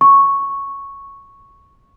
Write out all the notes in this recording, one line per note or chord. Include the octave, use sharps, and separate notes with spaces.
C#6